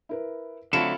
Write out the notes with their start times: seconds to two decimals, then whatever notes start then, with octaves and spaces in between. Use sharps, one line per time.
0.09 E4 A#4 B4
0.73 D3 F#3 A3 C4 E4 F4 A4 E7